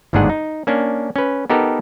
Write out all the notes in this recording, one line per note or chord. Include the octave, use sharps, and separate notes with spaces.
G1 D#2 G#2 D4 G#4 F#5
D#4
A#3 C#4 D4
C#4 B4
B3 D#4 G4 A4 A#4